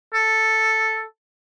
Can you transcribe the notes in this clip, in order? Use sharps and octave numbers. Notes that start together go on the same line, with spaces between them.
A4